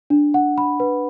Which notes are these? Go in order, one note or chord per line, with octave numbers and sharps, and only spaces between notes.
D4
F#5
B5
B4